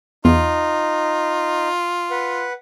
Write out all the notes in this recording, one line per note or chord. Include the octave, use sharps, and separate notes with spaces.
E2 D#4 F4
B4 F#5